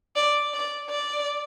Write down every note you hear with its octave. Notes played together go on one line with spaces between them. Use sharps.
D5
D5
D5